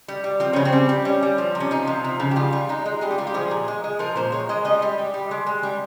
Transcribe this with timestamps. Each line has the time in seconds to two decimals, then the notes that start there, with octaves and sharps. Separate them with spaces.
0.08 G3
0.24 G3
0.40 F3 C4
0.53 C#3 C#4
0.65 C4
0.73 G3
0.89 G3
1.05 G3 C#4
1.23 G3
1.38 F3
1.55 C3
1.60 C#4
1.71 F3 D#4
1.87 C3
2.04 F3
2.20 C#3
2.31 G4
2.36 G3 F4
2.53 G3
2.69 G#3 D#4
2.86 G#3
3.01 G3 G#4
3.11 G4
3.18 G3 F4
3.27 G4
3.34 F3 G#4
3.51 A#2
3.68 G#3
3.84 G#3
3.99 F3 A#4
4.16 A#2 C5
4.32 G#3 C#5
4.49 G#3 D#5
4.65 G3 D#5
4.82 G3
4.98 G3
5.14 G3
5.31 G#3
5.46 G#3
5.63 G3